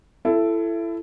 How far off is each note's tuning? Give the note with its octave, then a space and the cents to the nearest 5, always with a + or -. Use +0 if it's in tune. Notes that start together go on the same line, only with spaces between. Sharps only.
E4 +25 A4 +0